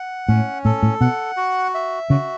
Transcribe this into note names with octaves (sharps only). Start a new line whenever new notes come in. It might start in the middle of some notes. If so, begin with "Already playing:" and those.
Already playing: F#5
A2 C#4
A2 A4
A2
B2 F#5
F#4
E5
C#3 F#4